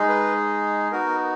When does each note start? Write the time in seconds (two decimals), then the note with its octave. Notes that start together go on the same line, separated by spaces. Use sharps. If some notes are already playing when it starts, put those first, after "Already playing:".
Already playing: G#3 D#4 G#4
0.08 B4
0.91 B3 D#4 F#4 A#4